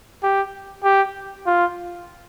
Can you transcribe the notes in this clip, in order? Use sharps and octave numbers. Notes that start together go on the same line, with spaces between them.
G4
G4
F4